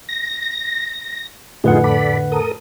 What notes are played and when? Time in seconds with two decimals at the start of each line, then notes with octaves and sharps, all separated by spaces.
0.09 A#6
1.64 F2 A2 D3 D#4 F4 G#4 B4 F#5
1.84 A4 D5 B5
2.32 A4 A#4 D#6